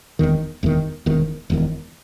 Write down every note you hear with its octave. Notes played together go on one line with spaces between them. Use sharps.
E1 E2 D#3
E1 E2 D#3
E1 E2 D#3
E1 E2 D#3